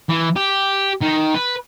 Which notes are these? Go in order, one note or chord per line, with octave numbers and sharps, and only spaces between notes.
E3
G4
D#3
B4